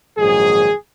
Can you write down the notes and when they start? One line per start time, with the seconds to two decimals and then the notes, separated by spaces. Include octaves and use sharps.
0.18 A#1 G#2 D#3 F#3 G#4